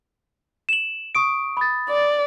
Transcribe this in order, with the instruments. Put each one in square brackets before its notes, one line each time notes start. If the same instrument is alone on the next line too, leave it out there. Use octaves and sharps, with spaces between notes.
[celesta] E7 F#7
C#6 D#6 D7
B5 D#6 A6
[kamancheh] D5